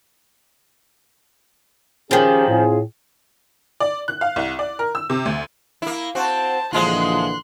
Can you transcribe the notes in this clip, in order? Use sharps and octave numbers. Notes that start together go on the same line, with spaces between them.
D#3 F3 C#4 G4 G#4
A2 C4 F4 G#4
D5
F#6
F5
C2
D5
A#4
E6
C3
D2
A#3 E4
C4 F#4 C5 A5
A#1 D3 E3 F3 G#3 F4 C6 F#6